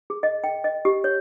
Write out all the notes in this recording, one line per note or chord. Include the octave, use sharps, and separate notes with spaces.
G#4
D#5
G5
D#5
G4
C#5